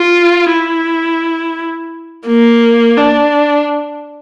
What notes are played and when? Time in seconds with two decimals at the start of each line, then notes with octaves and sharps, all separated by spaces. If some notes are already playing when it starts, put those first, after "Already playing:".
Already playing: F4
0.51 E4
2.27 A#3
2.97 D4